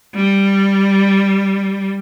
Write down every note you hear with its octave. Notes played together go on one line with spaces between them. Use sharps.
G3